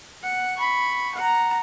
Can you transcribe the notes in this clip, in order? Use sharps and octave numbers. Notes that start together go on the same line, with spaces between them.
F#5
B5 C#6
F#5 A#5